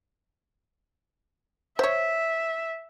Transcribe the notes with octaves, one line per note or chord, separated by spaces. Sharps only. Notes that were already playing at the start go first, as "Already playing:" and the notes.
C5 C#5 E5